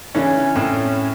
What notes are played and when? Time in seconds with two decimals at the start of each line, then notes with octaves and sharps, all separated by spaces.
0.15 C#3 E3 C#4 D4
0.56 A2 C4